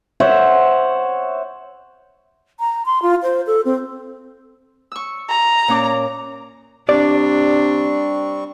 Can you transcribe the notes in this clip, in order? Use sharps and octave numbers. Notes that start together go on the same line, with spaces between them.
C5 C#5 E5 F#5
A#5
C6
F4
C5
A4
C4
C#6 E6
A#5
A#2 C#4 D6
C3 G3 C4 D4 D5 C#6